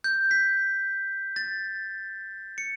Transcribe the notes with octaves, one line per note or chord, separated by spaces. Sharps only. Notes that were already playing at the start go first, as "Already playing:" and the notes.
G6
B6
A6
C#7